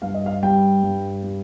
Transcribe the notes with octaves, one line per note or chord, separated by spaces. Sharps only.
G2 F5
D#5
F5
G3 G5
G2
G3